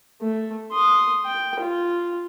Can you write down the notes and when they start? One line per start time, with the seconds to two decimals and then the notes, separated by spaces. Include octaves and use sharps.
0.22 A3
0.72 C6 D#6
1.26 G5
1.60 F4